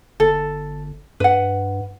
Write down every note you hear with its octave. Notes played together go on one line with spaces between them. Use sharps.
G1 A4
G2 B4 F#5